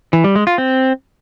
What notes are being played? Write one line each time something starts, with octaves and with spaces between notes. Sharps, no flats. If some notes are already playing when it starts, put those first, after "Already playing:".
E3
G3
G#3
F4
C4